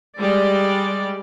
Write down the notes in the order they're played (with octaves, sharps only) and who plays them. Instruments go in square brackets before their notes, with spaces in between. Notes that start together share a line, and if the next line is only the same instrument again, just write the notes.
[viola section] G3 G#3 D5